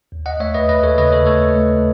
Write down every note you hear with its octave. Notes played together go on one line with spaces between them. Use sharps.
D#2
D#5 F#5
A3 C#5 E5
B4 D#5
D#2 B4 D#5
A4 C#5
C#3 B4 D#5
A4 C#5
A3 A4 C#5
A3